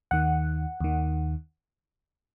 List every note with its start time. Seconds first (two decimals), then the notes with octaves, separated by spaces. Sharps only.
0.11 D#2 D#3 F#5
0.81 D#2 D#3